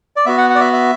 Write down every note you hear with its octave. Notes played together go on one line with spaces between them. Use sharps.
D5
B3 F#4 E5
F#5
F#5
D5
E5
E5